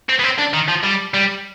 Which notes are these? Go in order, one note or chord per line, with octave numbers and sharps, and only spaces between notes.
C4
B3
C4
D4
D#3
F3
G3
G3